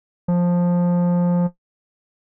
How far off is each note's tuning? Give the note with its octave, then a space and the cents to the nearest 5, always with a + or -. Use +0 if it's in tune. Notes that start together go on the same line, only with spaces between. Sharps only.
F3 +10